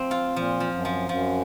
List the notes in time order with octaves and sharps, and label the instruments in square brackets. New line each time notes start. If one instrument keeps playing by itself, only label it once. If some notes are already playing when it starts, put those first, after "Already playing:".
Already playing: [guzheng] F3 C4
F4
[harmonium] A#2 [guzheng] F3
[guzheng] F3
[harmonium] F#2
[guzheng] F3
[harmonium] F#2 [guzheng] F3